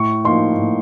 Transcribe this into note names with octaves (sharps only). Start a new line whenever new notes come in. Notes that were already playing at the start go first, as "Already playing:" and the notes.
Already playing: A2 C#6
F3 A#3 D#4 C6
A2